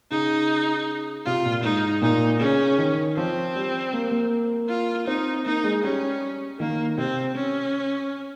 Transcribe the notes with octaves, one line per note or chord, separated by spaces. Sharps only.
C#3 D#4
C3 F4
A#2
G#2 D#4
A#2 D#4
C#3 C#4
D#3
F3 C4
G3
A#3
A#3
F4
C4 D#4
A#3 D#4
G#3
G3 C#4
D#3 A#3
C3 C4
C#4